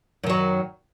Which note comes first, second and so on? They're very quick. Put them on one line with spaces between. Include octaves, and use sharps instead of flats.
F#2 D#3 F#3